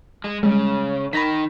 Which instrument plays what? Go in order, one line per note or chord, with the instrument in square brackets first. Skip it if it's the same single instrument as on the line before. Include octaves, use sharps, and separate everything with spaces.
[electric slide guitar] G#3
[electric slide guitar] C#3 [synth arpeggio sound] G3 G#3
[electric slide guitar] D#3 D#4 [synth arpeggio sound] B5 A#6 B6